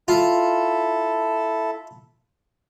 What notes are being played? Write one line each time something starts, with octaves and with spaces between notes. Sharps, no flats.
E4 F4 A4